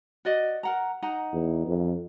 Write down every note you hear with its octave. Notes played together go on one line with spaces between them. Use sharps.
F#4 D5 D#5
A#4 F#5 A#5
D#4 F#5 A#5
E2
F2